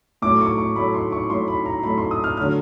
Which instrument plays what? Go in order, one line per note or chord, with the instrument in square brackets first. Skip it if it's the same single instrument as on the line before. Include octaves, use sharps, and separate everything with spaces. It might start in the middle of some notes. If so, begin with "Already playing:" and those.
[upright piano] A2 F#3 A3 D6
C#6
C#6
A2 F#3 A3 B5
C6
C#6
A2 F#3 A3 C6
B5
A#5
A2 F#3 A3 B5
C6
D#6
F6
D3 F#3 A3 F6